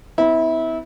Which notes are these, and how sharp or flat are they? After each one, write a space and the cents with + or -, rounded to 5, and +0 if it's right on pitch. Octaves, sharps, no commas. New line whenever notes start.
B3 +45 E4 -25